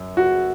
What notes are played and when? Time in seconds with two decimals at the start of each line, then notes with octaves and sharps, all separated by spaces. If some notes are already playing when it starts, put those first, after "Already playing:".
Already playing: F#2
0.17 F#4